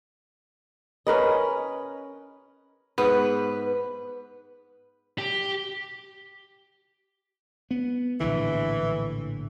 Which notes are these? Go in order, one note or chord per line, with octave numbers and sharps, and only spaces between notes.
C#4 A#4 B4 D#5
G#2 B3 B4
G4
B3
A#1 A2 D3 E3